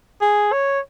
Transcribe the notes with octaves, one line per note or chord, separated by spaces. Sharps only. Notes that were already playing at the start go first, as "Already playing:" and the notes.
G#4
C#5